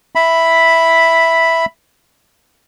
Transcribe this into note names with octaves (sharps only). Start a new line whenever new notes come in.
E5 B5